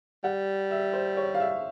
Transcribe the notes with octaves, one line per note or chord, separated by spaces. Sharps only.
G3 F#5
E5
C5
C#5
F5
E5